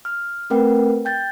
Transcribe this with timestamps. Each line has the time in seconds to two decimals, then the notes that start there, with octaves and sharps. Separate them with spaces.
0.05 F6
0.50 A3 C4 A#4 B4 F#5 G5
1.05 G5 G6 A6